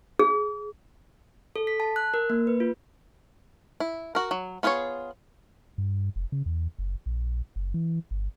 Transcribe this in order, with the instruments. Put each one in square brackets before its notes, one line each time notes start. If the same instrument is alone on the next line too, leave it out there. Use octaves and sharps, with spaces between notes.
[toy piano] G#4
[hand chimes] A4
B6
A5
F#6
A#4
A#3
B4
F4
[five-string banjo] E4
F#4 A#4
F#3
B3 F4 G#4 B4 C#5
[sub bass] G2
F1
C#3
E2
F#1
A#1
F#1
E3
G1